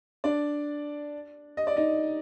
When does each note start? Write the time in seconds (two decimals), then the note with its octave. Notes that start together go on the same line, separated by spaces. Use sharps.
0.24 D4 D5
1.57 D#5
1.67 D5
1.76 D#4 D#5